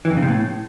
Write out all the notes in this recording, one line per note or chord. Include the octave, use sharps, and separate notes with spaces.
E3
F2
C#3
C3
A2